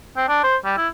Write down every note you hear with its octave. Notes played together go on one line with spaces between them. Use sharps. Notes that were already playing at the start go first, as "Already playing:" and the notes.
C4
D4
C5
G3
E4